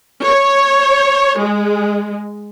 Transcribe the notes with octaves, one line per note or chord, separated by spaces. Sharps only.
C#5
G#3